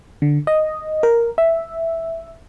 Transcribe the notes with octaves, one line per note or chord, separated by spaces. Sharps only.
D3
D#5
A#4
E5